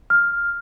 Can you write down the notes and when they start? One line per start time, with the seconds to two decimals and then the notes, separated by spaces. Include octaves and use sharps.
0.10 F6